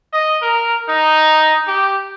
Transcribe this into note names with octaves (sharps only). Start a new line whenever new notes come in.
D#5
A#4
D#4
G4